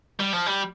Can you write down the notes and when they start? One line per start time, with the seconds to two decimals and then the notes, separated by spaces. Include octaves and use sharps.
0.20 G3
0.33 F3
0.47 G3